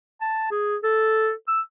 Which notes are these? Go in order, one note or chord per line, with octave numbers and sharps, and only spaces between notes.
A5
G#4
A4
E6